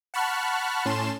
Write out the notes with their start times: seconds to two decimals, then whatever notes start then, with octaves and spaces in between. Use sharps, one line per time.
0.14 F#5 A5 B5 C#6 F6 F#6
0.85 A2 C#4 A5 C6 E7